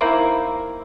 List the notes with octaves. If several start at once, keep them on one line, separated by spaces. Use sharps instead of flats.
D#3 A#3 C4 E4